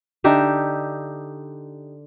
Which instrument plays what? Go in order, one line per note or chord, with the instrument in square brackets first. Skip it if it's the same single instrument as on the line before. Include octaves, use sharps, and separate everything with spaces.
[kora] D3 D#4 G4 E5